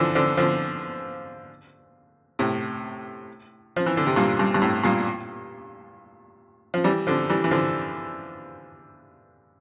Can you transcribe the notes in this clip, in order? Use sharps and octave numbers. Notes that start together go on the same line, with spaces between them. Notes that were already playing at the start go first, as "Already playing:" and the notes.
Already playing: D3 E3 F3
D3 F3
D3 F3
A2 C3
F3
E3
D3
C3
G2 A#2
G2
G2
A2
G2 A#2
F3
E3 G3
D3 F3
E3 G3
E3
D3 F3